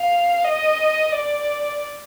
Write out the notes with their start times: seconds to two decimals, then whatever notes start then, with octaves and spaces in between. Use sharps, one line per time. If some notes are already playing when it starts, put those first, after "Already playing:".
Already playing: F5
0.44 D#5
1.12 D5